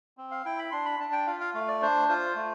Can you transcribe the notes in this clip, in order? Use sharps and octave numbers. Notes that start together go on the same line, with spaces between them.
C4
F5
E4 G5
B5
D4 C6
B5
D4 A5
G5
F4 F5
F5
A3 F5
D5
D4 C5
F4 C5
A3